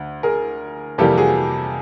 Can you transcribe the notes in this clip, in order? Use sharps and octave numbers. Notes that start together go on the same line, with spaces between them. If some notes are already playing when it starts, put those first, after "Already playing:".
Already playing: D2
G#4 A#4
F2 C3 E3 G3 A#3 G4 A4
F#4 G#4